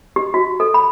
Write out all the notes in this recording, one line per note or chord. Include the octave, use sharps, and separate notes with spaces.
G4
F#4
A4
B5